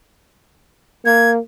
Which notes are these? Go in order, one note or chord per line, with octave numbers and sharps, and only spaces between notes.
A#3 G#6